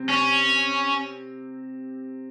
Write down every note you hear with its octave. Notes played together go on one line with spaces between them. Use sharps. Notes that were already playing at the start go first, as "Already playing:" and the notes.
Already playing: C3 C4
C#4